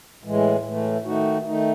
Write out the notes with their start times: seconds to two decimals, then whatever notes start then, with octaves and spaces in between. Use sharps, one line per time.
0.24 A2 E3 G#3
0.64 A2 E3 A3
1.05 D#3 A3 D#4 F#4
1.46 D#3 A3 D#4